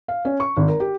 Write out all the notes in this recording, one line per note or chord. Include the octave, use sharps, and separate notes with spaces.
F5
C#4
C#6
G#1
A#4
G4